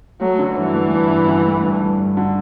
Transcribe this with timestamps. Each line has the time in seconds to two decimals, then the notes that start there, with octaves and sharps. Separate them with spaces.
0.21 F#3 A3
0.39 D3
0.56 G2 E3
0.74 A3
0.93 G2
1.10 G2
1.28 D3
1.46 A3
1.63 G2
1.81 G2
1.99 G2
2.17 D3